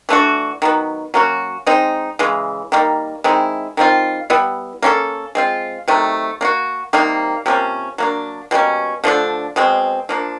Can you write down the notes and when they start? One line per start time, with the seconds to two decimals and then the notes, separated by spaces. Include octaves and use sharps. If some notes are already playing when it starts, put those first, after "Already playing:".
0.09 E3 A3 D4 F#4
0.62 D#3 F#3 B3
1.14 F#3 A#3 C#4 F#4
1.66 G#3 C4 D#4
2.19 C#3 E3 G#3
2.72 D#3 G3 A#3
3.24 D#3 G#3 C4 E4
3.77 D#3 G3 C4 F4
4.30 G3 B3 E4
4.82 A#3 C#4 F#4 A4
5.35 G#3 C4 F4
5.88 C3 D#3 F#3 A3
6.41 A#3 D4 F#4
6.93 C3 D#3 G3 A#3
7.46 C3 F3 A#3 C#4
7.98 F#3 A#3 D4
8.51 B2 G3 A#3 C#4
9.04 D3 F3 A3 D4
9.56 B2 G#3 C4
10.09 F3 A#3 D4